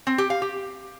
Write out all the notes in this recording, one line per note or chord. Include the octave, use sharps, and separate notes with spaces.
C4
G4
F5
G4